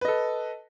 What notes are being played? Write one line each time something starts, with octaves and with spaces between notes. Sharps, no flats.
A4 B4 D#5